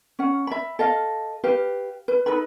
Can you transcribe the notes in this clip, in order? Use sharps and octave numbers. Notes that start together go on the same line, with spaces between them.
C#4 F#5
E5 B5
A4 D#5 F5
G4 B4 F5
B4
D#4 A4 B4 B5